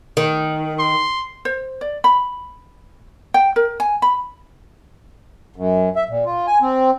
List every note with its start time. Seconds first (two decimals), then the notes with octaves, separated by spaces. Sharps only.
0.17 D#3
0.79 C6
1.45 C5
1.81 D5
2.04 B5
3.34 G5
3.56 A#4
3.80 G#5
4.02 B5
5.56 F#2
5.96 E5
6.09 A#2
6.26 F4
6.47 G#5
6.62 C4